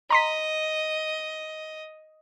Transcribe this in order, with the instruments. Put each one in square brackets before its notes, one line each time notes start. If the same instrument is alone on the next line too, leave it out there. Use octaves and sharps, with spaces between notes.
[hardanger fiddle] D#5 [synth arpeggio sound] A#5 C6 B6